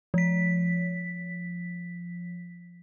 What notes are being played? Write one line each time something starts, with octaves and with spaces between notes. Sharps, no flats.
F3 B6